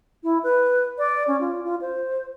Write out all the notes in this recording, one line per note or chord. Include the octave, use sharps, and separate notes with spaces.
E4
B4
D5
C#4
F4
F4
C5